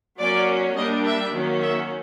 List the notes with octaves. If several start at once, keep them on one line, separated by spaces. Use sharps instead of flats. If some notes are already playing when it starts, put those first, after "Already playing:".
F#3 A#3 C#4 D5
G3 A#3 D4 D#5
E5
D#3 F#3 A#3 C#4
E5